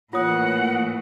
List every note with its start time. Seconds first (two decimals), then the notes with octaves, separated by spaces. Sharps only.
0.13 A2 E3 A#3 F4 C#5 F#5 D#6